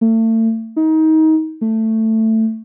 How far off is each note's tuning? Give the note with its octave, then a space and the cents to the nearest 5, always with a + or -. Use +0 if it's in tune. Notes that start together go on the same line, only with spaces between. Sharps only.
A3 +35
D#4 +25
A3 +10